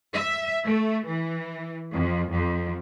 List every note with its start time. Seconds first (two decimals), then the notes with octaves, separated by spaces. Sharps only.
0.14 E5
0.64 A3
1.06 E3
1.92 F2
2.30 F2